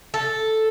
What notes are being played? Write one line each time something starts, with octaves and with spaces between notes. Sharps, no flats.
A4